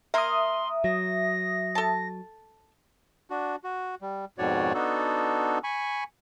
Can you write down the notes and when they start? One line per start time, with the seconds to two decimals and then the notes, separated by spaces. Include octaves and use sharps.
0.14 A#3 A#4 E5 C6 D#6
0.84 F#3 A#6
1.75 A4 A5
3.30 D4 F#4
3.64 F#4
4.02 G3
4.38 F2 G#2 B2 F#4 C#5 D5
4.74 B3 D4 D#4 F#4 A4
5.64 G#5 B5 C#6